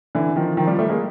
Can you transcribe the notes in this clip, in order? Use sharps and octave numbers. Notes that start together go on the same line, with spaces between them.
D3 E3
D#3 F3
D#3 F3
F3 G3
G3 A3
G#3 A#3